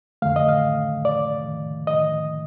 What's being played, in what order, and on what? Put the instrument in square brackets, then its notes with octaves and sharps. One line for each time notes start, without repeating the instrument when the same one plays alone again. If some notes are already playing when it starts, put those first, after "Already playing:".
[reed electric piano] F2 D3 A3 F5
D#5
F5
D5
D#5